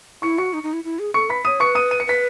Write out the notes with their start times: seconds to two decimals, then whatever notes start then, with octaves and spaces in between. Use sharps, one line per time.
0.22 E4 C#6 C#7
0.38 F#4 C#6 C#7
0.53 D#4
0.63 D#4
0.73 E4
0.84 E4
0.99 G#4
1.14 A4 C#6 C#7
1.30 B4 B5 B6
1.45 C#5 D#6 D#7
1.60 B4 C#6 C#7
1.75 D#6 D#7
1.91 D#7
2.00 C#7
2.07 B4 B6